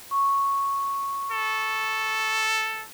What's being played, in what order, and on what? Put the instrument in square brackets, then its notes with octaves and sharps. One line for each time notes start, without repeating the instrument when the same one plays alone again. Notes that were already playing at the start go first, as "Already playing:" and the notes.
[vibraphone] C#6
[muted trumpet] A4